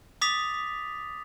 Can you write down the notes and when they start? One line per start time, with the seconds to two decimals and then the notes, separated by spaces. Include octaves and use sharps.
0.21 D6 D#6 A6 B6 F7